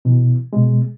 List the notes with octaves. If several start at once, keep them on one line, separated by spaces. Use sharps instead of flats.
B2 E3
B2 G#3